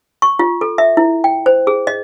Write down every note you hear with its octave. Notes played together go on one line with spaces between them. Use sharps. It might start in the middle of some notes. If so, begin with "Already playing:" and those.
C#6
F4
A4
E5
E4
G5
C5
G#4
D#5